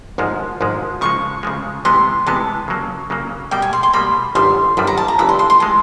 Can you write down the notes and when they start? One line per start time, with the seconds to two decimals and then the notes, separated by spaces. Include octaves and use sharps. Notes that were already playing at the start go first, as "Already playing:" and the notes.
0.18 G#1 G#2 F3 G#3
0.61 G#1 G#2 F3 G#3
1.01 C#3 F3 G#3 C#6
1.43 C#3 F3 G#3
1.85 C3 E3 G#3 B3 C6
2.26 C3 E3 G#3 B3 A5
2.68 C#3 F#3 A#3
3.10 C#3 F#3 A#3
3.51 B2 G3 A#3 G5
3.62 G#5
3.73 C6
3.83 C6
3.93 B2 G3 A#3 B5
4.35 G1 F#2 D#3 G3 C6
4.77 G1 F#2 D#3 G3 B5
4.87 A#5
4.97 A5
5.08 A#5
5.19 G1 G2 E3 G#3 B5
5.29 C6
5.39 C6
5.50 C6
5.60 E3 G#3 A5